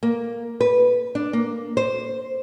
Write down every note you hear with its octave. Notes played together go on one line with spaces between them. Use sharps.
A#3
B4
D4
A#3
C5